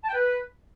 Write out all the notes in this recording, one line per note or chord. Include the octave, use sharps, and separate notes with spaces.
A5
G5
B4